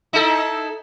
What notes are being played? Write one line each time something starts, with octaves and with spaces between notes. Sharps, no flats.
D#4 E4 A4